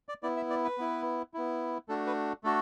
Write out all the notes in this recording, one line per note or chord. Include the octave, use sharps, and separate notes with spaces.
D5
B3 E4 D5
E5
D5
B4
B3 E4
B3 E4
A3 D4 F#4 A4
B4
A3 D4 F#4 A4